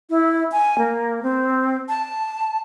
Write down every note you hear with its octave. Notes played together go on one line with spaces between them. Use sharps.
E4
G#5
A#3
C4
A5